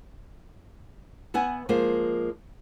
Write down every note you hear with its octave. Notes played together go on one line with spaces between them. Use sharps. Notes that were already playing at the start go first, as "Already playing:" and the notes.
B3 E5 F#5 G#5
F3 G#3 A#3 C5